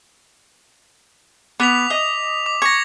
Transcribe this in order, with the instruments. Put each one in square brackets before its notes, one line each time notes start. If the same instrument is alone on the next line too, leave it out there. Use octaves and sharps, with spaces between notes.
[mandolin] B3 [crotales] D6 B6 F7
[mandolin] D#5
[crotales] D6
[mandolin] C#6 [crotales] G#6 A#6